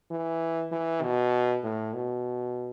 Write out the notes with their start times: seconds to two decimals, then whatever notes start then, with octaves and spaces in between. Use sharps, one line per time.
0.11 E3
0.71 E3
1.02 B2
1.63 A2
1.94 B2